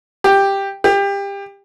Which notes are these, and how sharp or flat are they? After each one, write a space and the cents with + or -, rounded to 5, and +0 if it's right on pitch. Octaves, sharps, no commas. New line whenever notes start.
G4 +5
G4 +25